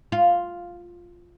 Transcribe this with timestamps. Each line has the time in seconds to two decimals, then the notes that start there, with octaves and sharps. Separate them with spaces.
0.12 F4